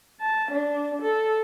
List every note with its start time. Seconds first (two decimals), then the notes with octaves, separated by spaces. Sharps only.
0.20 A5
0.51 D4
1.02 A4